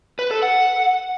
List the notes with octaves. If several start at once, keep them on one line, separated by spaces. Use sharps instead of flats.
B4
A4
F#5